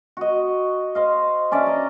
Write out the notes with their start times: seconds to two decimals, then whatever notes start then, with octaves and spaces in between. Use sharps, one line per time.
0.17 F#4 D#5
0.95 C5 D#5 F5
1.52 C#4 D4 D5 E5
1.66 D#5 A#5